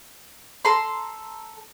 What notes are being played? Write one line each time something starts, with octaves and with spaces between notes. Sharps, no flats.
A4 A#5 C6